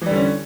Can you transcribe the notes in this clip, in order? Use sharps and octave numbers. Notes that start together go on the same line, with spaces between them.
D3 E3 G3 C#4